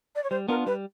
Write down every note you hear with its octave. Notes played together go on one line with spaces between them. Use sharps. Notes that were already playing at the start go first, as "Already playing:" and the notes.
D5
C#5
G3 C5
B3 D4 F4 A#4
G3 B4